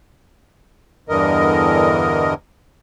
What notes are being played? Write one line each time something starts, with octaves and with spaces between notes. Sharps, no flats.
E2 G2 D3 E3 A#4 D#5